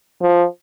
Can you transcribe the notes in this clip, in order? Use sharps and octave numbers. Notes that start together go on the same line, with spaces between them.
F3